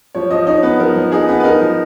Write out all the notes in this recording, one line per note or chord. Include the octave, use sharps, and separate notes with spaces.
F3 C#5
F3 D#5
D#4 C#5
B3 B4
F3 A#4
F3
D#4 G#4
B3
B4
D#4 A#4
F3